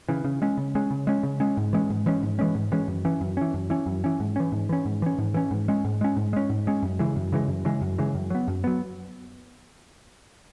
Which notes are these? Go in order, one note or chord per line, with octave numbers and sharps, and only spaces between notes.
C#3 E3
C#3
G#3 C#4
C#3
G#3 C#4
C#3
G#3 C#4
C#3
G#3 C#4
G#2
E3 G#3 C#4
G#2
E3 G#3 C#4
G#2
E3 G#3 C#4
G#2
E3 G#3 C#4
F#2
E3 C#4
F#2
E3 C#4
F#2
E3 C#4
F#2
E3 C#4
G#2
E3 C#4
G#2
E3 C#4
G#2
E3 C#4
G#2
E3 C#4
G#2
G#3 C#4
G#2
G#3 C#4
G#2
G#3 C#4
G#2
G#3 C#4
F#2
C#3 E3 G#3
F#2
C#3 E3 G#3
F#2
C#3 E3 G#3
F#2
C#3 E3 G#3
F#2
F#3 B3
F#2
F#3 B3